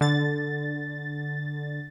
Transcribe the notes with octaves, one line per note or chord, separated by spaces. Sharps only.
D3 A6